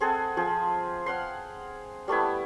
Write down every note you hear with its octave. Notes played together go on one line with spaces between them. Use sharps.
C4 G#4 A4 F#5
F3 F4 G#4 C5
F5 F#5 C6
G3 A3 B3 E4